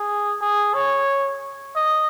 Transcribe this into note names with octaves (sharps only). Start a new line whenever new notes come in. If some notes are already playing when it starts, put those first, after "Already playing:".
Already playing: G#4
G#4
C#5
D#5